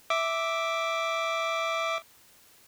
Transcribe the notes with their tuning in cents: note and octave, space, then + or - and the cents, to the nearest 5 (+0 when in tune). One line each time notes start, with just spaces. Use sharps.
E5 -5 D6 +0